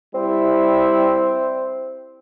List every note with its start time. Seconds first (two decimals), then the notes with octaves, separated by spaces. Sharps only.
0.15 G3 C4 E4